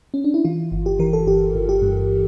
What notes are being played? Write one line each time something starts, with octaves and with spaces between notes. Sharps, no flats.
C#4
D4
E4
E3 F4
G1
G4
E3 A#4
A4
G1 G4
G1
G4
G2